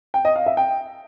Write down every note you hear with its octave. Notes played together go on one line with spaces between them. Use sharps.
G5
D#5
F5
E5
G5